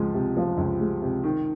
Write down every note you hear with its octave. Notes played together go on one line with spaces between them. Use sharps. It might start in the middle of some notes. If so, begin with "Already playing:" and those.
Already playing: C#2 F3 G#3
C3
F3
C#2
G#3
C3
D#3